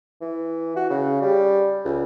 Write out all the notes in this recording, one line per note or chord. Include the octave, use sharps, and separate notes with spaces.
E3
F#4
C#3
G3
C#2